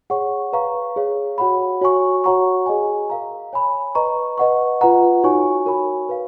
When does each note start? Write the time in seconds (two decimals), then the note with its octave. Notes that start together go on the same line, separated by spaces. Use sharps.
0.10 G#4 C#5 F#5 C#6
0.53 B4 F5 A#5 C#6
0.96 G#4 C#5 F5
1.38 F#4 C#5 F#5 B5
1.82 F#4 C#5 G#5 C#6
2.24 F#4 C#5 F#5 A#5 C#6
2.66 G#4 D#5 G#5
3.10 A#4 F5 A#5
3.53 C#5 G#5 B5
3.95 B4 D#5 A#5 C#6
4.38 B4 D#5 F#5 C#6
4.81 F4 B4 F#5 A#5
5.23 D#4 F#4 C#5 G#5 C#6
5.66 F#4 A#4 C#5 G#5 B5
6.09 B4 F5